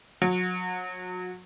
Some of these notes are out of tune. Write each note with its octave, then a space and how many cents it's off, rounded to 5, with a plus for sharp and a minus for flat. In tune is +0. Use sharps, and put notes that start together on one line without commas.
F#3 -30